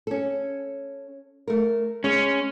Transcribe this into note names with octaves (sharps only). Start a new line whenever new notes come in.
C#4 A4
A3 A#4
G#3 C#4